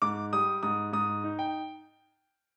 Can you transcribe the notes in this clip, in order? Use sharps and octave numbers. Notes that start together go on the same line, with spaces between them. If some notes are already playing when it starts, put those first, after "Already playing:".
G#2 D6
G3 D#6
G#2 D#6
G#2 D#6
D#4
G5